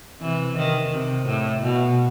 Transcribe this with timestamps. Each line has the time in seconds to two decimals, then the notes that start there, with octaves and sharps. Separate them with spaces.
0.22 C3 E3
0.57 D#3
0.92 C3
1.27 A2
1.62 B2